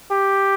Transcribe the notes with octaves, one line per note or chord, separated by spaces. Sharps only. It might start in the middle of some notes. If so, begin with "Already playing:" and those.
G4